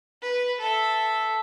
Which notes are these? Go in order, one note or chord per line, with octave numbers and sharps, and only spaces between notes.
B4
A4 E5